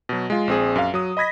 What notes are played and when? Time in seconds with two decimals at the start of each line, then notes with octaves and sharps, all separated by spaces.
0.09 B2 F#3
0.30 G#3 F4
0.48 A#1 C4 G#4
0.76 F#2 F5
0.94 F#3 D#6
1.17 D#5 B5 G#6 A#6 B6